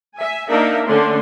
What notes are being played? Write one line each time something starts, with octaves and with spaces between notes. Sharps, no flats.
E5 G#5
A#3 D4 D#4 A#4 E5 F5
D3 A3 C#4 D4 C6